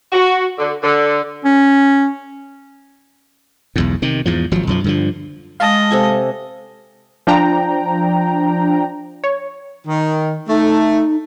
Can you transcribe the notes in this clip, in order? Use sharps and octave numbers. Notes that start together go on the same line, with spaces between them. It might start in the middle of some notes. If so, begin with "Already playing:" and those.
F#4
D3
D3
C#4
B1 E2 G#2
C3 D#3
E2 G#2 F3
G#1 F3 F#3
B1 F#2 F3
G2 D3 F3
G#3 D#5 F5 A5
C3 A4 G#5
F3 D4 G5 A#5
C#5
D#3
A3 D#4